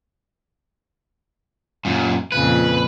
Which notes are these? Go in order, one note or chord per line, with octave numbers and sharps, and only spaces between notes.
F#2 A#2
F2 A#2 C#3 B4